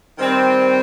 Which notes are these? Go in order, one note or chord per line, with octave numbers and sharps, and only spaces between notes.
D#3 G3 C4